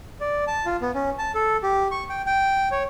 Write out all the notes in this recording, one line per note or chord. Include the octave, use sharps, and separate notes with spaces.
D5
A5
F4
B3
C#4
A5
A4
G4
C#6
G5
G5
C#5